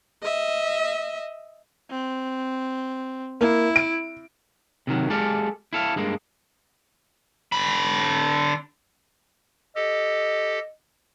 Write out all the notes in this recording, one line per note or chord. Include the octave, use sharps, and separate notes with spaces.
D#5 E5
C4
A#3 E4
D7
C3 D#3 F#3
G#3 G4 A4 D5 F5
E4 A4 F5
G2 G#3 A#3
D3 B5
G4 A4 D#5